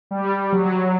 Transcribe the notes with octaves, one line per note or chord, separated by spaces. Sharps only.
G3
F#3